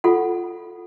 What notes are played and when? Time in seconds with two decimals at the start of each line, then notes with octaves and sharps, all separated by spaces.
0.04 F4 A4 F#5